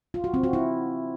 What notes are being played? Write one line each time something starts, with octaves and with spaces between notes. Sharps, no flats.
F4
F#4
C4
F#4
E4